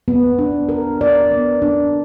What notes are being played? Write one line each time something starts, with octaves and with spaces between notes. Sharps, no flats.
B3
D4
A#4
D5
B3
D4